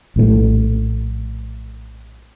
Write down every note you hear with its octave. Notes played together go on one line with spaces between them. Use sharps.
A#1 A2 D3 A3